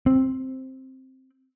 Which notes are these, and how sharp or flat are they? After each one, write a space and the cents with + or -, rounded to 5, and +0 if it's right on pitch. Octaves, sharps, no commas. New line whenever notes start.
C4 +5